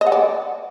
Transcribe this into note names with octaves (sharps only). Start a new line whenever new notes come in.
D#5
F#5
D5